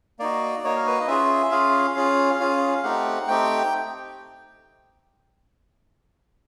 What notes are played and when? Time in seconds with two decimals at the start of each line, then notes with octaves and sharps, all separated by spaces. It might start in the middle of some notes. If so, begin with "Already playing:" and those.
0.19 A#3 D#4 F#4 D5
0.64 A#3 D#4 F#4 C#5
0.76 A#4
0.86 B4
1.00 D#5
1.07 C#4 F4 G#4 E5
1.51 C#4 F4 G#4 F5
1.96 C#4 F4 G#4
2.39 C#4 F4 G#4
2.83 A3 C4 D#4 G4 F#5
3.27 A3 C4 D#4 G4 G5